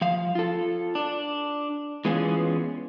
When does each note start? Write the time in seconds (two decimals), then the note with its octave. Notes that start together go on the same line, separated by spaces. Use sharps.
0.01 F3 F5
0.35 F4 A4
0.95 D4
2.05 E3 G#3 B3 C#4 F4 G#4